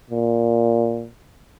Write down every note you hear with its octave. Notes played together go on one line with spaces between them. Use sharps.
A#2